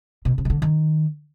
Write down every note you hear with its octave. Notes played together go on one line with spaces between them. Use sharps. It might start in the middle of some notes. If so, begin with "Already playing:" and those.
B2
C3
D#3
D3
D#3